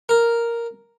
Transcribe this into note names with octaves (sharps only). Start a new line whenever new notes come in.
A#4